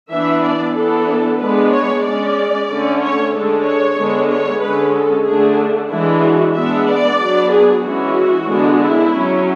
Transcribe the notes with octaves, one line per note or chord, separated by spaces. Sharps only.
E3 B3 D4 E5
D5
E3 B3 D4 A4
G#3 B3 D4 B4
C#5
G#3 C#4 D5
D3 A3 C#4
C#5
D3 G#3 D4 A4
C#5
D3 G#3 B3 D4
C#5
D3 G#3 C#4 B4
A4
D3 A3 D4 G#4
E3 G#3 D4 E4
F#4
G#3 B3 D4 E5
D5
F#3 B3 D4
G#4
E3 G#3 C#4 F#4
D3 G#3 B3 D4
E4
F#3 C#4